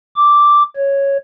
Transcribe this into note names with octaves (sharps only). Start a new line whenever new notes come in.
D6
C#5